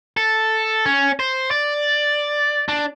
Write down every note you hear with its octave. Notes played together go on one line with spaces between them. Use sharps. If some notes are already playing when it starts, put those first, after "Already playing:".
A4
C#4
C5
D5
D4